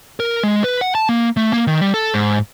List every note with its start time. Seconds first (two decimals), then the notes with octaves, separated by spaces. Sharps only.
0.20 A#4
0.43 G#3
0.64 B4
0.81 F#5
0.95 A5
1.09 A#3
1.37 A3
1.53 A#3
1.67 D#3
1.81 G3
1.94 A4
2.14 G#2